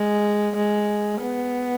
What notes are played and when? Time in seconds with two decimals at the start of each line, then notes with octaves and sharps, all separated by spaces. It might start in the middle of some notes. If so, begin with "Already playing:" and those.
Already playing: G#3
0.57 G#3
1.21 B3